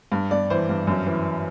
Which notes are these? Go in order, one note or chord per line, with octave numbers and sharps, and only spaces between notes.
G2
G2 D5
E3 C5
G2
F#2
E3